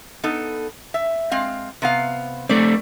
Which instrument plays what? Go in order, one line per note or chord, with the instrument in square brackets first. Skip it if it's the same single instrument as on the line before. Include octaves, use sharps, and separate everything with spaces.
[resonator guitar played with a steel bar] B3 D#4 A4
E5
G#3 C4 F5
C3 B3 F5
[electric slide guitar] A3 C4 [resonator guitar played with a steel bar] D5